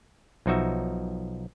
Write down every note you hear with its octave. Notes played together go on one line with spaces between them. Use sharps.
B1 F3 D#4 F#4 E5